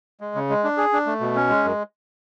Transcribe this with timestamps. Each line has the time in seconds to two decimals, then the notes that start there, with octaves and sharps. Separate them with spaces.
0.21 G#3
0.35 C#3
0.49 G#3
0.64 D4
0.77 G#4
0.93 D4
1.06 A3
1.20 B2
1.35 C#4
1.49 G#3
1.64 F#2